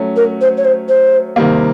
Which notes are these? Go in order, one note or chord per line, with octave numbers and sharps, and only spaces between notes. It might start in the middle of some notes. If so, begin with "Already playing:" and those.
Already playing: F#3 A3 C#4
A#4
C5
C#5
C5
C5
C3 D#3 G3 A#3